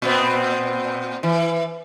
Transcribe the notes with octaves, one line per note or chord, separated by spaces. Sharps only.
A#2 B3 C4
E3